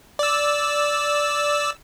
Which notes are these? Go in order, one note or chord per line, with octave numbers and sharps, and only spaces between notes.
D5 E6